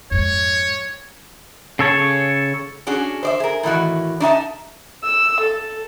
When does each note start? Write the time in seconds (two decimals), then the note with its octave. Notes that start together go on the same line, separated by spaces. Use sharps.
0.11 F2 G#2 C#5
1.79 C#3 A4 C#5 A5
2.87 C#4 D4 F#4 G#4
3.23 C5 D5 E5
3.40 G#4 A#4
3.63 A2 D#3 E3 F#4
4.20 D4 D#4 E5 A5
5.04 E6
5.41 A4